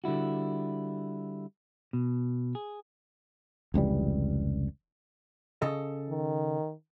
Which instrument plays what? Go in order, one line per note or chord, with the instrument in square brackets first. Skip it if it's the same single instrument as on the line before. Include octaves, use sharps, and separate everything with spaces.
[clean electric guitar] D3 G3 E4 F#4
B2
G#4
[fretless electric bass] F1 C#2 E3 G3
[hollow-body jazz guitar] C#3 A4 D#5
[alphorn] D#3